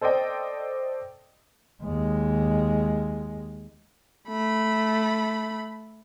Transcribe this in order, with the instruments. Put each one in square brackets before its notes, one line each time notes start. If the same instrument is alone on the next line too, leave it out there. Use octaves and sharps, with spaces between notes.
[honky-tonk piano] A4 C5 D5 D#5 G5
[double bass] D#2 G#3
[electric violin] A3 B5